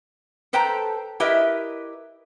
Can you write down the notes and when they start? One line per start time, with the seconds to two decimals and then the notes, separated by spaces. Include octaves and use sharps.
0.53 A4 B4 C5 G5 A5 A#5
1.20 E4 G4 A#4 B4 D#5 E5